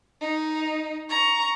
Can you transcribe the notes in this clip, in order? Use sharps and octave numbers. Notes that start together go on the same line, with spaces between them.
D#4
A#5 C#6